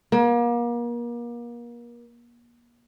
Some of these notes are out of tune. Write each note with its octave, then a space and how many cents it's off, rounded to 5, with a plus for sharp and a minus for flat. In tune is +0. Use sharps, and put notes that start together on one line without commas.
A#3 +35